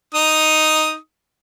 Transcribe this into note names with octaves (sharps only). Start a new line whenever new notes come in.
D#4 D#6